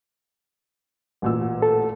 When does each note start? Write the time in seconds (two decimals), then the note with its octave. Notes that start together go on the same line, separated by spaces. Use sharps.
1.22 A1 A#2 E6
1.62 A4